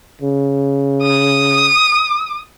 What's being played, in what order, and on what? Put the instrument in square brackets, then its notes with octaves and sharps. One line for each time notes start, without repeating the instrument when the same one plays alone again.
[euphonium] C#3
[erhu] D#6